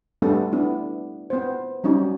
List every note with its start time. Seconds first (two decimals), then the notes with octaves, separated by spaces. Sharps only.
0.22 G3 A3 B3 D4 A4
0.52 B3 D4 E4
1.30 B3 C5
1.84 F#3 G3 C#4 D#4